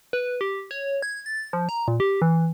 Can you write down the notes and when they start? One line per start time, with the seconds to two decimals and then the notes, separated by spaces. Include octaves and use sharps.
0.13 B4
0.41 G4
0.71 C#5
1.02 G#6
1.26 A6
1.53 F3
1.69 A#5
1.88 A#2
2.00 G4
2.22 E3